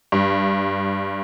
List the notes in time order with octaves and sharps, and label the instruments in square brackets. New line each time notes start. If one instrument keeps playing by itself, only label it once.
[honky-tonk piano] G2